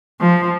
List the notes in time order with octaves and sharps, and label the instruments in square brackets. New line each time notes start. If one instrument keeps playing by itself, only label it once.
[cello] F3